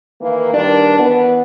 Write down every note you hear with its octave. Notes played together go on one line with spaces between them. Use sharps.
D#3 E3 A#3
G2 D#3 D4
E3 B3